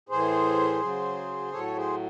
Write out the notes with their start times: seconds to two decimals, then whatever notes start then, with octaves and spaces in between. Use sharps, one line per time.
0.09 A2 E3 G#4 C5
0.81 C#3 F#3
1.52 A2 F#3 A4 C#5
1.77 G#4 C5